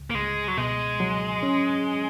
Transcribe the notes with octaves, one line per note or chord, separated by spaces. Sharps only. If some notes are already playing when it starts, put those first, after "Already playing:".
Already playing: C#2
A#3
C#2 G#3
F#3
B2 G#3
F#3
C#4